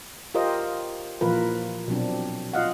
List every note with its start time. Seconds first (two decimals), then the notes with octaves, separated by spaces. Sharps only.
0.35 F4 G4 A#4 C5 D#5
1.21 A#2 E3 F3 F4 A#4 B4
1.88 B2 F#3 C4 D4
2.53 F4 D#5 F5 F#5